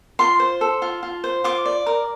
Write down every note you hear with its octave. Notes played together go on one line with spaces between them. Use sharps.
F4 C6
C5
A4
F4
F4
C5
F4 D6
D5
A#4